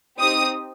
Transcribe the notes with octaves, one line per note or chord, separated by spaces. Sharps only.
C4 D#4 G4 D#6